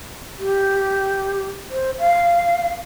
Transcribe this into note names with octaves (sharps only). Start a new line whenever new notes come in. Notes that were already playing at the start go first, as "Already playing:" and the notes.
G4
C5
F5